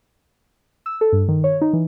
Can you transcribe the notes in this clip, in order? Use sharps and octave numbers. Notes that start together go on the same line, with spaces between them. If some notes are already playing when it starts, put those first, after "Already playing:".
E6
A4
G2
D#3
C#5
D#4
E3